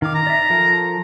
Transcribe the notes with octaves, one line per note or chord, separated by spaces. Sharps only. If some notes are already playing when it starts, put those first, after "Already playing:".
D#3 F5 D6
A#5
D5 E5
F3 A4 A#4